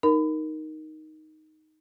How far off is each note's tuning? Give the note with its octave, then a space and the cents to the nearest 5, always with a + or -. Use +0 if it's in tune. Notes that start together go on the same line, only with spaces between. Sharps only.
D#4 +0 A#4 +0 B5 +30